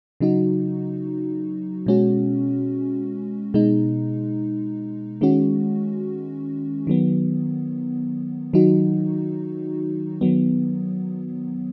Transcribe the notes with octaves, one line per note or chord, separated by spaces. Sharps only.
C#3 F#3 D#4 F#4
B2 G#3 C#4 F#4
B2 G#3 D#4
D#3 G#3 C#4 F#4
D#3 F#3 B3
D#3 F#3 D#4 F#4
D#3 F#3 B3